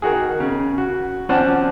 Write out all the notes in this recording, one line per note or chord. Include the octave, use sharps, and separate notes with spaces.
D#3 F#4 G#4
C#3
F#4
F3 C4 C#4 D5 F#5 A5